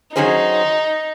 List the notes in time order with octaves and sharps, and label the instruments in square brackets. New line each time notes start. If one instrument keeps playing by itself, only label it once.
[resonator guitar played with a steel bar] D#3 F#3 C#4 G#4 C5 [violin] D#4